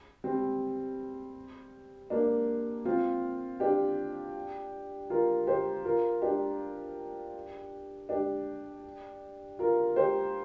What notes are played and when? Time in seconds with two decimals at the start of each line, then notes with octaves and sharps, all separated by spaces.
0.24 G3 C4
2.10 A#3 D4
2.85 C4 F4
3.60 D4 G4
5.10 F4 A#4
5.47 G4 C5
5.85 F4 A#4
6.22 D4 G4
8.09 D4 G4
9.59 F4 A#4
9.96 G4 C5